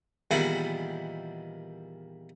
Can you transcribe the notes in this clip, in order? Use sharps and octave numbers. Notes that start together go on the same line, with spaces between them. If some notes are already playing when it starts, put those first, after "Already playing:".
E2 A#2 D#3 G3 E4 F#5